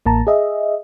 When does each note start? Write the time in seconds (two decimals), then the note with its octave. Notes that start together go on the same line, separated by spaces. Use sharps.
0.06 A1 A#3 A5 A#5
0.27 G#4 D#5 E5